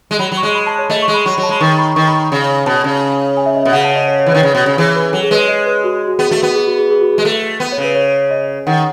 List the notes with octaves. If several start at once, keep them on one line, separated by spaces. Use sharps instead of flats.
G#3
F#3 B5
F#3
C#6
G#3
B5
A5
C#5
A3 D#5
C#6
G#3
B5
F#3 C#6
B5
F#3
A5
G#3 B5
D#3 C#6
B5
D#3 C#6
B5
B5
C#3
B2 A5
C#3
G#5
E5
D#5
B2 E5
C#3 F#5
A5
D#5
C#5
C#5
E3
D#3 B4
C#3
B2
C#3
E3 G#4
B4
F#3 A4
G#4
G#3 B4
C#5
D#5
B4
F#4
F#4
B3 G#4
A3 F#4
B3 F#4
G#4
F#4
G#4
G#4
F#4
G#4
G#3
A3 A4
B3
C#5
C#3
B4
C#5
D#5
D#3 F#5